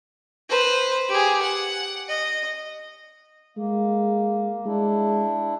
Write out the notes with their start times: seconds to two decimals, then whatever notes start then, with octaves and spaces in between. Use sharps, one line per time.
0.49 B4 C5
1.09 G4 G#4
1.42 F#5
2.09 D#5
3.57 G#3 A#3
4.66 G#3 D4 E4